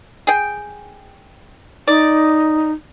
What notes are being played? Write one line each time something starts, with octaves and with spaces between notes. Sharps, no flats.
G#4 G5
D#4 D5